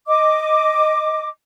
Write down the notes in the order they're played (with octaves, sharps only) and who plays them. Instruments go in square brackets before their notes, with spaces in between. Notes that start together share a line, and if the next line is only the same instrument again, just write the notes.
[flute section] D#5 D6